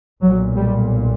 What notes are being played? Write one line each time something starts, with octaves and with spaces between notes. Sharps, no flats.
B1 A#2 F#3
G3